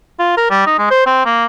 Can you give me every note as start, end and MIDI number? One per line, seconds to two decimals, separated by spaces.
0.19 0.33 65
0.37 0.47 70
0.50 0.62 55
0.66 0.77 63
0.79 0.87 56
0.90 1.06 72
1.06 1.21 60
1.26 1.46 58